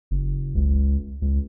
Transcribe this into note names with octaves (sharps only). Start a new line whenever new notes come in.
F#1
C#2
C#2